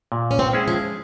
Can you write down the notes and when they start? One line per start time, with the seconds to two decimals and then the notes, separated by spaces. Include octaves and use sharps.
0.12 A#2
0.31 C#4
0.39 C4
0.53 G#3 C#4 E4 G#4
0.68 F3